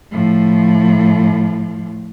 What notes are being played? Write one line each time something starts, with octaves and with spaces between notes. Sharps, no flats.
A2 F3